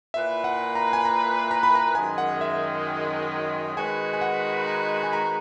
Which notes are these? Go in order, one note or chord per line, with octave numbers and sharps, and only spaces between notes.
A#2 A#3 E4 B4 E5
F#5
A#5
G#5
A#5
A#5
B5
A#5
F#2 D#3 G#3 G#5
F#5
E5
D#3 G#3 D#4 F#4 B4 G#5
G#5
F#5
A#5
G#5
A#5